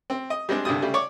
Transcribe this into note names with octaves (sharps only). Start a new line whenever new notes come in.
C4
D#5
G3 G#3 C4 D4
C2 G2 D3 G3 D#6
C#3 G3 A3
C#5 D5 C#6 D6